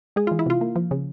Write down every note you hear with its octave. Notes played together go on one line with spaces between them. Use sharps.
G#3 G#4
F4
E3
E4
C3 F4
A#3
F3
C#3